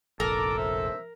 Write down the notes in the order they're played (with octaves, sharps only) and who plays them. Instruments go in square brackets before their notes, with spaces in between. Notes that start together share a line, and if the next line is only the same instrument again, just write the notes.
[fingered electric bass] F1 A#1 [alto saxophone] A4 [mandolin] A#4 [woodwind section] A5 D6
[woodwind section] C5 E5